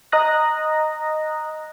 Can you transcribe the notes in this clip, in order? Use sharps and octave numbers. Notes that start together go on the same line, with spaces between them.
D#5 A#5 D#6 F#6 A#6